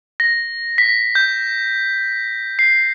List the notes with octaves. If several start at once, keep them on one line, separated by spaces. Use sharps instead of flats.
A#6
B6
G6
C7